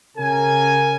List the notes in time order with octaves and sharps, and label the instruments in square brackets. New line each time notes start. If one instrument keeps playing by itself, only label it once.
[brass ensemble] C#3 A#4 G#5